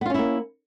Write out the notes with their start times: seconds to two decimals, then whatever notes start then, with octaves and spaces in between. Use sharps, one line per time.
0.01 B3
0.06 F4
0.10 C#4
0.14 E4
0.19 A#3